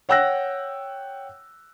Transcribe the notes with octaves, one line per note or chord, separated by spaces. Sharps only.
C#5 F#5 G5 E6 F#6 A#6